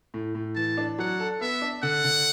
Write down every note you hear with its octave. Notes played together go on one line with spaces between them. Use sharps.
A2
A2
E3 A5
D4
F#3 F#5
A4
B3 E5
D4
D3 F#5
D3